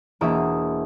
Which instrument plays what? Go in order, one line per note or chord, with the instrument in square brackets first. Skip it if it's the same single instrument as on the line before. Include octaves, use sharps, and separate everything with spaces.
[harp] E1 A#3 E4 E5 D#6